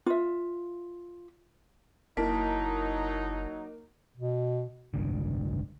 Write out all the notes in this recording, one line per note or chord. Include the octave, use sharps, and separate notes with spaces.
F4 E5
F#1 F#3 A#3 D#4 E4 A5 B6
B2
F#1 C2 G#2 D3